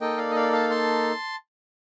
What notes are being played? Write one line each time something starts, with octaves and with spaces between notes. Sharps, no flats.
A#3 D#4 A4 D#5 G5
D5 F5
D#5
D5 F5
F5 A5
A5 C6